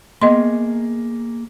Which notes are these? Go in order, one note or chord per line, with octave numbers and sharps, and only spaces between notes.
A#3 B3 G#4 D#5 C6